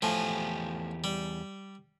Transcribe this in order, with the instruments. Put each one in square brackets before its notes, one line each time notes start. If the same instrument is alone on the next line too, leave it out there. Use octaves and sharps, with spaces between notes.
[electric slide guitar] E2 G4 G#5 [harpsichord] A2 F3
[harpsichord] G3